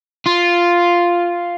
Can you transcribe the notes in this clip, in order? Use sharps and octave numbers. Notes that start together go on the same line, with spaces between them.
F4